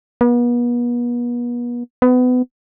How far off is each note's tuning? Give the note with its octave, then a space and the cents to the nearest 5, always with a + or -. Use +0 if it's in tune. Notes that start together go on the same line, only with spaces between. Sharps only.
B3 -40
B3 +25